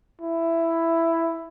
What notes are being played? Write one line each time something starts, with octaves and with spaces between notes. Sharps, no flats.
E4